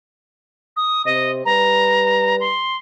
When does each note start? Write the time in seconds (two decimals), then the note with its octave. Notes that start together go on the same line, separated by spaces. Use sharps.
0.76 D#6
1.05 C3 C5 D#5
1.45 G3 B4 A#5
2.40 C6